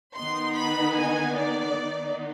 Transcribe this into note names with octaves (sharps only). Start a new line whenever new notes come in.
D#3 B3 D#4 C6
B5
G#5
D5
D#3 B3 D#4